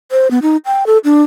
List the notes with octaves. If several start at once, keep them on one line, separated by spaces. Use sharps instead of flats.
C5
B3
D#4
G5
A4
D4